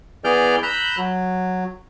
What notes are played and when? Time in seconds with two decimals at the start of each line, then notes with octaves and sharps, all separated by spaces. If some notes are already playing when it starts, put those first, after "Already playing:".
0.24 E3 B3 G#4 D5 F6 G6
0.63 A#5 B5 E6 F#6 G6
0.97 F#3